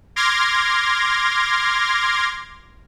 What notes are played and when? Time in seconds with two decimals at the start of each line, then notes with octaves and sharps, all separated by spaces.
0.16 C6 D6 F6 G#6 A#6